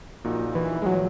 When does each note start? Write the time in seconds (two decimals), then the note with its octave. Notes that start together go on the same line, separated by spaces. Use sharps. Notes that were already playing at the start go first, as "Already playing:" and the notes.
0.24 A#1 A#2 A#3 D#4 F#4
0.55 E3
0.82 G#3
0.86 A#2 F#3 A#3 D#4 F#4